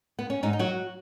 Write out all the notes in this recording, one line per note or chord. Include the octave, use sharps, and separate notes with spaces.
B3
C#4
G#2 D#4
D#4
F#3 F#4